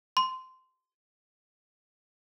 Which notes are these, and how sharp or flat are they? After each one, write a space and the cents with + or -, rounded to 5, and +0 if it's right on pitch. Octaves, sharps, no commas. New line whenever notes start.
C6 -15